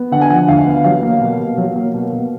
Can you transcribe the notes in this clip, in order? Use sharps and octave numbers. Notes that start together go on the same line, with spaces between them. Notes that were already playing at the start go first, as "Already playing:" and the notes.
Already playing: B3
D3 F#5
G#5
F3 F#5
D2 F5
B3
F#3 F5
A#3
B2
B2
F#3
A#3
B2
B2